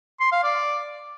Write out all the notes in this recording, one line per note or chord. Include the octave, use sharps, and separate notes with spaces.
C6
F5
D5